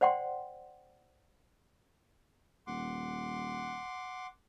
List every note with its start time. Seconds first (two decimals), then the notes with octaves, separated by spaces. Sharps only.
0.01 C5 D5 F#5 G5 C6
2.67 D#1 F#5 C6 D6